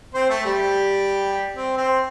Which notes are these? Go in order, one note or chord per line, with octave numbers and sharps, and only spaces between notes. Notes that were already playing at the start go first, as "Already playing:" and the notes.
C4 C5
A3 A4
G3 G4
C4
C4 C5